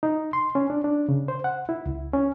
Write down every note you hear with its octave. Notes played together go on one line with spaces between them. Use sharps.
D#4
C6
C#4
D4
D4
C#3
C5
F#5
E4
C#2
C#4